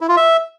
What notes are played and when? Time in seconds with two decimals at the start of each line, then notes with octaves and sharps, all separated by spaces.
0.01 E4
0.09 F4
0.17 E5